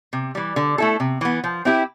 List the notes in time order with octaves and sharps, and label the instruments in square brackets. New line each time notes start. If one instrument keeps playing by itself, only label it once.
[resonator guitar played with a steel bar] C3
E3 G3
D3
A3 E4 A4
C3
E3 B3
F3
C4 E4 G4